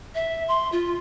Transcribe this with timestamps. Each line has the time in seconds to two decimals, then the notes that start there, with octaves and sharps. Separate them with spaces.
0.15 E5
0.48 C6
0.72 F4